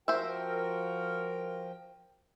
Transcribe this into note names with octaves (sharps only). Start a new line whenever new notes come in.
F3 F4 F#4 A#4 C5 E5 G5